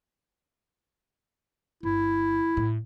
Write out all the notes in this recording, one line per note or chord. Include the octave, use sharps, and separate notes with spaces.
G1 E4
A2